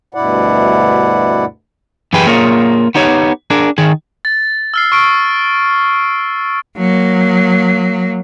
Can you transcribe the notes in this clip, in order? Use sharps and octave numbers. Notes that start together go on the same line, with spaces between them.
D2 G2 B2 E4 D5 F#5
F#2 E3 G4 G#4 B4 G5
A#3 F4 G#4 A#4 C#5
B3 D#4 G4 C#5
D4 G#4 A#4
D#3 G#4
A6
E6 F6 C7
C#6 F6 D7
F#3 A#3